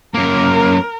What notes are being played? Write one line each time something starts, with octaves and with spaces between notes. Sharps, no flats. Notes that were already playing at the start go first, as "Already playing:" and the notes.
F#2 A#3 A#4